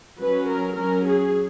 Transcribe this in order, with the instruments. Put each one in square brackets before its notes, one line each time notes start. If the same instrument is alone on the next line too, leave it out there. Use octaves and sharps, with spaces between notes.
[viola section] F#3 C#4 B4
A#4
F#3 C#4 A#4
G#4